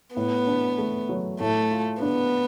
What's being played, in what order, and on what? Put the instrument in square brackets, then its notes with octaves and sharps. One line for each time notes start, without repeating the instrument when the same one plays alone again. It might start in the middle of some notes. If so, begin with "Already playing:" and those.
[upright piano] A2 [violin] B3
[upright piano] D4
A3
F#3
[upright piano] A2 [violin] A3
[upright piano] F4
[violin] B3 [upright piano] D4